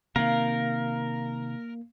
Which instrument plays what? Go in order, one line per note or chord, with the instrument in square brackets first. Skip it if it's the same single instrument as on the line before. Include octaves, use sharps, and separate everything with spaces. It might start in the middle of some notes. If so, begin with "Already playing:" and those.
[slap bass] C3 D#3 [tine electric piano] A#3 [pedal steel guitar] A#4 [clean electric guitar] F5